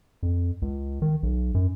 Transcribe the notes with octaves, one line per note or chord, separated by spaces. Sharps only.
F2
C#2
D#3
B1
F#2